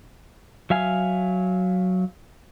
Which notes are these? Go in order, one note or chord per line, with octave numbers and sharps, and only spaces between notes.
F#3 E5 F5 G#5